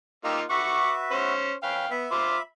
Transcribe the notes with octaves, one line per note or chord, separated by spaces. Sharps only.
A#3 D#4 F4 G4 A#5 E6
F#4 B4 E5 F#5 C#6 D6
C#4 C5
C#4 B4 F5 G5
B3 E5 B5
F4 C5 D6